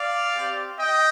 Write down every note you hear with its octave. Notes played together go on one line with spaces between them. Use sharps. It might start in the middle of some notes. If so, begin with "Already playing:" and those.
Already playing: D5 F5
C4 G4
D#5 G5